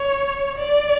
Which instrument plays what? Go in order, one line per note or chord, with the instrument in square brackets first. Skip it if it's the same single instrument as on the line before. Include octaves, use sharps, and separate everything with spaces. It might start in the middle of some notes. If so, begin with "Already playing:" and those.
Already playing: [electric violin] C#5
D5